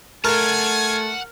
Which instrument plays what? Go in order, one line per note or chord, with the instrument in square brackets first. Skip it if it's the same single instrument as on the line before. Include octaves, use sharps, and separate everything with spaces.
[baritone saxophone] A3 [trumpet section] F4 G#5 [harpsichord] A#4 [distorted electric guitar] F#5 A5